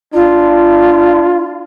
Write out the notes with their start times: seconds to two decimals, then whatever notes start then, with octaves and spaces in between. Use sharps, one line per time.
0.14 D4 F4